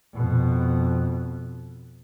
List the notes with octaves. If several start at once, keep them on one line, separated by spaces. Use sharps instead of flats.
F2 B2